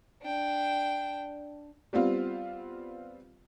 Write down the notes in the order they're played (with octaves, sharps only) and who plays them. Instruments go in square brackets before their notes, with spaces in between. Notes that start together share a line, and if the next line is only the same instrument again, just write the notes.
[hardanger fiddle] D4 G5
[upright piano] G3 B3 C4 F4